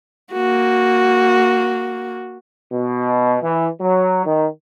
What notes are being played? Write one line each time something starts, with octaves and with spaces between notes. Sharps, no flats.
A#3 F#4
B2
E3
F#3
D#3